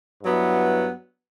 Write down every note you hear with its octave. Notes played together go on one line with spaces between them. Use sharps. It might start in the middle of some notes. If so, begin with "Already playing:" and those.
G2 F#3 B3 E4